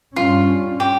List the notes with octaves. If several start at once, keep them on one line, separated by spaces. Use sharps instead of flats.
G2 G3 C#4 F4
G4